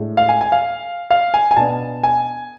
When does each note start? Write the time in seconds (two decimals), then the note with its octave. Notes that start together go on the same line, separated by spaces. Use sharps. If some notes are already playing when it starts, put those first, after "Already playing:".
Already playing: A2 G#3 D4
0.17 F5
0.29 G#5
0.41 G#5
0.52 F5
1.10 F5
1.34 G#5
1.51 G#5
1.56 B2 B3 D4 A5
2.03 G#5